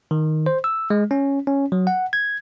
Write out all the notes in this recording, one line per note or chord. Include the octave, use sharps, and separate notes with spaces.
D#3
C5
E6
G#3
C#4
C#4
F#3
F#5
G#6